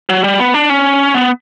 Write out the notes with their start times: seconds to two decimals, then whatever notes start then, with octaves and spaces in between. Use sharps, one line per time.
0.09 F#3
0.24 G3
0.40 B3
0.54 D4
0.70 C#4
1.14 B3